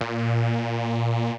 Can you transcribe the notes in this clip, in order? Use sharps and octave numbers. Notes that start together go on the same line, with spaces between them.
A#2